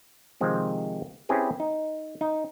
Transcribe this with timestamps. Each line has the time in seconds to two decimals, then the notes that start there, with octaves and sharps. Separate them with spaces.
0.41 C3 D#3 F3 G#3 C4
1.29 C4 C#4 E4 G4 G#4 B4
1.60 D#4
2.21 D#4